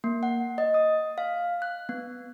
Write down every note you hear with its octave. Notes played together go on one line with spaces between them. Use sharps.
A#3
F#5
D#5
D#6
F5
F#6
B3